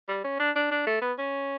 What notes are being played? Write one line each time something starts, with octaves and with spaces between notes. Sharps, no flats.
G3
C#4
D4
D4
D4
A3
B3
C#4